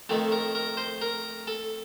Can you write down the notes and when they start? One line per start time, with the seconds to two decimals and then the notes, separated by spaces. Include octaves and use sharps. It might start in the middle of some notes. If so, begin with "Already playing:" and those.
0.09 F2 D#3 A3 A4
0.32 A#4
0.55 A#4
0.77 C5
1.01 A#4
1.47 A4